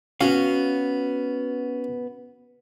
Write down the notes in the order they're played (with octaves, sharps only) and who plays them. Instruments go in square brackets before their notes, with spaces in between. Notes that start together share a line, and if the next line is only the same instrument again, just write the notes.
[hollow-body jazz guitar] B3 F#4 F5 [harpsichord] C#4